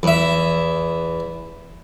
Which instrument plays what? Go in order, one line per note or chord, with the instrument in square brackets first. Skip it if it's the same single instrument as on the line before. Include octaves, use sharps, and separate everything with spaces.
[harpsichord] E2 E5